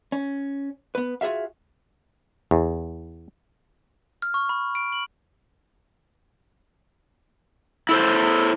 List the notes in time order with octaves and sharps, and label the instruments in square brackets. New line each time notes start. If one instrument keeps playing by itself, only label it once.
[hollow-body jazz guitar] C#4
B3 B4
F4 F#4 G#4 E5 F5
[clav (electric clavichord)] E2
[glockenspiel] F6
C#6
B5
D7
F#7
[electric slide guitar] E4 A4 C5